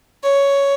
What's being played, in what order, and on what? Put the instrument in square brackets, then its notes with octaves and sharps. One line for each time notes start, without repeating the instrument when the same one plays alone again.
[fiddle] C#5